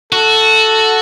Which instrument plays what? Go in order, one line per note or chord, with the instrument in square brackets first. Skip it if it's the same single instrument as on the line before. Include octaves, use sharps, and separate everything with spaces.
[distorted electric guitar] F#4 [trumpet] A4